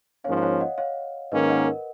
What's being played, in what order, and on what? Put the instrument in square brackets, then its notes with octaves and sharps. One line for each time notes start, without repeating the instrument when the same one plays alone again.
[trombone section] G#2 F3 A#3 C#4 [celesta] C#5 F5
[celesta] C#5 F5
D#5 F#5
C#5 F5
[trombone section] G#2 D#3 A#3 C#4 [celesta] B4 D#5
[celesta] D#5 F#5
A#4